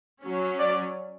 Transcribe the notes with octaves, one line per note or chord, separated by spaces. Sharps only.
F#3 C#4
D5